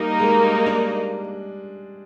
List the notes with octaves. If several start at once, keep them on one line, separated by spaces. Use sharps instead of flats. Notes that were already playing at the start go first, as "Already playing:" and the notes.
Already playing: G3 A#3 D#4 A#4
G#3
G3
D4